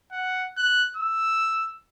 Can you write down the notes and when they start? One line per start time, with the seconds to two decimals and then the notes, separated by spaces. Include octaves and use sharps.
0.12 F#5
0.57 F#6
0.97 E6